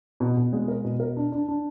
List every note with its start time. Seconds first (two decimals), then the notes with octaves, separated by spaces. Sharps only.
0.20 B2
0.37 B2
0.53 G#3
0.68 A#4
0.84 B2
1.00 A#4
1.17 D4
1.32 D4
1.48 D4